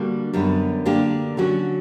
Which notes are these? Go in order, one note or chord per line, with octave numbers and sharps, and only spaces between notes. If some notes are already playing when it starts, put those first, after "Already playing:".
Already playing: D3 G3 A#3 D4 F#4
F#2 D3 G3 B3
D3 A#3 D4 G4
D3 F#3 C#4 F#4